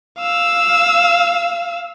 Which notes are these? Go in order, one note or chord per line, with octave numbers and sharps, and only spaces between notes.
F5 E6